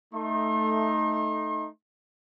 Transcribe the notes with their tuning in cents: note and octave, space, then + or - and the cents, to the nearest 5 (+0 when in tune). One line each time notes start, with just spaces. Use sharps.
A3 +0 D#4 +0 C6 +45